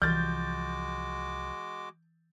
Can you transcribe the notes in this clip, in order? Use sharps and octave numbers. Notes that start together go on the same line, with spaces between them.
C2 E3 F3 G#3 F#4 D6 G6 A6